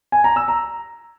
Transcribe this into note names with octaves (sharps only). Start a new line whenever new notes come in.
G#5
A#5
E6
A#5